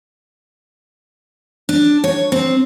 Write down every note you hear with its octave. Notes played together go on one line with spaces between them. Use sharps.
D4
C#5
C4